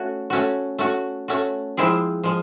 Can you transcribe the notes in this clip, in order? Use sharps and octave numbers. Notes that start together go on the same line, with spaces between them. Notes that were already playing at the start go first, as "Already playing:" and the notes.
Already playing: A3 C#4 F#4
A3 C#4 F#4
A3 C#4 F#4
A3 C#4 F#4
F3 G#3 C4 E4 G#4
F3 G#3